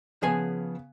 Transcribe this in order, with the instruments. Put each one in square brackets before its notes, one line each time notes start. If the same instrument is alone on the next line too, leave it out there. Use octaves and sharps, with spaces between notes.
[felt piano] C#3 B3 [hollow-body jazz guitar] F3 G#4 G#5